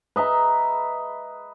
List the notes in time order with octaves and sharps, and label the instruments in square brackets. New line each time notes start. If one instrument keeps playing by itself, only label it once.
[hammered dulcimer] B4 D#5 E5 A#5